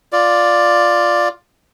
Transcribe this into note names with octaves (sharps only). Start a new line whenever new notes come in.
F4 D5